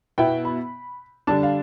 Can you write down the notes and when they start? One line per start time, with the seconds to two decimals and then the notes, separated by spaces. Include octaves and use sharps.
0.18 B2 B3 E4 G5
0.45 B5
1.27 D3 G3 D4 A5
1.43 F5